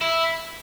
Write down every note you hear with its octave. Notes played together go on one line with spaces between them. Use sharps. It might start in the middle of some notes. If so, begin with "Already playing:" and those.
E4